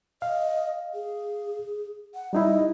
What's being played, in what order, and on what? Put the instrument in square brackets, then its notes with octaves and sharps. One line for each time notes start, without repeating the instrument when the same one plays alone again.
[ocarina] D#5 [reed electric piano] F5
[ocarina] G#4
F#5
[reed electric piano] G3 D#4 E4 [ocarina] D#5